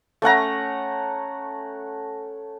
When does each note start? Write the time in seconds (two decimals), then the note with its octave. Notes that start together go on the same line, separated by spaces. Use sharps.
0.22 A3 C#4 F#5 A#5